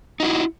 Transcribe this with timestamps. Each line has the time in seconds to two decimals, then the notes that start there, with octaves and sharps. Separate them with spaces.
0.20 D#4
0.23 F#4
0.25 E4